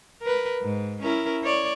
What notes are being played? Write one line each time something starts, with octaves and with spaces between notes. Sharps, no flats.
A#4 B4
G#2
C#4 E4 A#4
C#5 D5